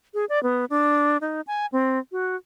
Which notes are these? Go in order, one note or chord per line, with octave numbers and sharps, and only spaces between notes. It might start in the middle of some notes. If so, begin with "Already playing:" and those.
G#4
D5
B3
D4
D#4
G#5
C4
F#4